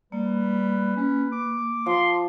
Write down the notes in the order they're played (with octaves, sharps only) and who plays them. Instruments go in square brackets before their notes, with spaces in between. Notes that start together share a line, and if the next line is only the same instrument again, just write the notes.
[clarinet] G3 [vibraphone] A#3 [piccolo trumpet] B4
[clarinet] C#4
D6
[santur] F3 [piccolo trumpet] C6